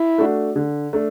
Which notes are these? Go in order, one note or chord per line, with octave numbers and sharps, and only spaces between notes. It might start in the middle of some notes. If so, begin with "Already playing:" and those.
Already playing: E4
A3 D4 F#4
D3
A3 D4